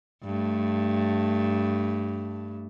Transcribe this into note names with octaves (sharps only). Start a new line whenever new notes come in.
G2 A3